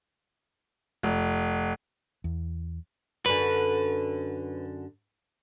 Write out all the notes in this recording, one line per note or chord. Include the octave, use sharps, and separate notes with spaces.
F1
E2
F#2 D3 B4